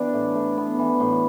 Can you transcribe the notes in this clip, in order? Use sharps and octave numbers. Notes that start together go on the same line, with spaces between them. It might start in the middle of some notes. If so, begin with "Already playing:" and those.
Already playing: E3 B3 D4
A2
A2
B3
E3
A2